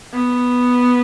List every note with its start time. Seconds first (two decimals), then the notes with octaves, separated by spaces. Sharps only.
0.13 B3